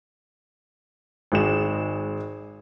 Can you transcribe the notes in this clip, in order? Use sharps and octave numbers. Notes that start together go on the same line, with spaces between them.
G#1 G#3 E7